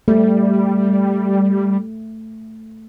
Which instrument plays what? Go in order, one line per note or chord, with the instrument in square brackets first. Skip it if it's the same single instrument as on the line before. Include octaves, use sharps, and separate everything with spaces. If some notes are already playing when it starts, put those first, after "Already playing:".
[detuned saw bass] G3 [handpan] A3